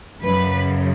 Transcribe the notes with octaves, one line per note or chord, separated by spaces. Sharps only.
F#2 C#3 F#3 B4